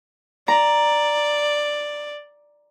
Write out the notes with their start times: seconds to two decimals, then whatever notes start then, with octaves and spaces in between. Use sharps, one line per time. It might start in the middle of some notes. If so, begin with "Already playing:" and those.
0.48 D5 A#5